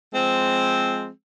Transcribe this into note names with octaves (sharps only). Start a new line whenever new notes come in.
F3 G#3 C4